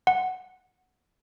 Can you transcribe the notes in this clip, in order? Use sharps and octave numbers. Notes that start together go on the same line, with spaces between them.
F#5